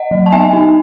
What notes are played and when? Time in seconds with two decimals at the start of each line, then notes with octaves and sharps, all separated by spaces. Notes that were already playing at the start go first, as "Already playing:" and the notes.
Already playing: D#5 F#5
0.11 F#3
0.26 A5
0.32 B3 E5 G#5
0.53 D#4